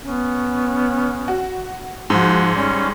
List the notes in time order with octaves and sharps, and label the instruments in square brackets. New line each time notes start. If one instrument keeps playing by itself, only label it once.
[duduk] B3 [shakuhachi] C#4
[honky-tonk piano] F#4
[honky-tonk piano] G#2 [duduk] F3 [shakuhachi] F#4
[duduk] G3 [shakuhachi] C#4